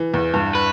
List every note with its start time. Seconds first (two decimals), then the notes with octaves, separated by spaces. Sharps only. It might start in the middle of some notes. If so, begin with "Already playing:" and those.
Already playing: E3
0.14 E2
0.34 G2
0.55 B4